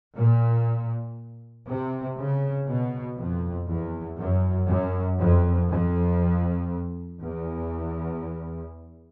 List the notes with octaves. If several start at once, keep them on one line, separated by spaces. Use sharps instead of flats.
A#2
C3
C#3
B2
F2
E2
F#2
F#2
F2
F2
E2